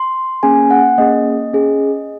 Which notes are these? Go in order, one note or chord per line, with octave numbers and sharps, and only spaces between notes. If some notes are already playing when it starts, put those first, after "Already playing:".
Already playing: C6
A#3 C#4 G#4 G#5
F#5
A#3 C#4 G#4 D#5
C#4 G#4